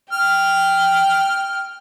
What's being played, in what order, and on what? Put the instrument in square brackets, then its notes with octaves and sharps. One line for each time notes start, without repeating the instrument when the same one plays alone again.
[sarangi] G5 [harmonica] F6